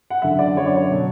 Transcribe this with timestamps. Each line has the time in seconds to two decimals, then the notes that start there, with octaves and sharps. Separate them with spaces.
0.10 F#5
0.22 F#2 D3 F#3 E5
0.39 D5
0.56 F#2 D3 F#3 C#5
0.66 D5
0.76 C#5
0.91 B2 F#3